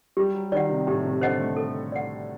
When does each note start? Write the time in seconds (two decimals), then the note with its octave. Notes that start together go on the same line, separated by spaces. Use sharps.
0.17 G3 G4
0.34 F#3
0.52 D#3 D5 F#5
0.69 C3
0.87 A2 G4
1.05 C3
1.21 D3 C5 D#5 F#5
1.40 A3
1.57 A4
1.92 D5 F#5